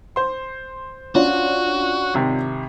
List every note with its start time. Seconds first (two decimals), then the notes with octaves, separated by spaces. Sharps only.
0.16 C5 C6
1.15 C#4 D4 F4 F#4
2.14 G#1 C3